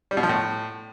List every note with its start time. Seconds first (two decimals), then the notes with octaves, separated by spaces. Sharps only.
0.11 G3
0.17 B2
0.23 F3
0.29 A2